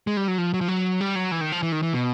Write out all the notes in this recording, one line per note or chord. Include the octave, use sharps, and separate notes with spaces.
G#3
G3
F#3
F3
F#3
F3
F#3
G3
F#3
E3
D#3
F3
E3
D#3
E3
B2